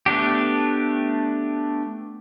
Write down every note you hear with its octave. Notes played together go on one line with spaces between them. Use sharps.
A3 B3 D4 G4